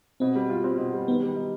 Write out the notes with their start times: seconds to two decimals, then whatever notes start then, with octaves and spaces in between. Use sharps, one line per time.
0.20 B2 C4
0.35 G3
0.50 F4
0.64 C4
0.78 B2
0.93 G3
1.08 D#3 B3
1.22 G3
1.36 D#4